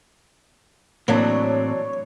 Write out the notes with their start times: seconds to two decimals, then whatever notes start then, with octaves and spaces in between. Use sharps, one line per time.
1.08 A2 E3 F#3 A#3 C4 D4 C#5